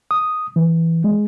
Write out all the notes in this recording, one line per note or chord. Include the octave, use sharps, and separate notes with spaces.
D#6
E3
G#3